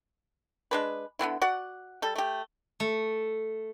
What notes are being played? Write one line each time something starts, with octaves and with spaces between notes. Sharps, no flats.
G#3 D4 B4
D3 B3 C4 E4
F#4 D5 F#5
G3 A4
A3 G4
A3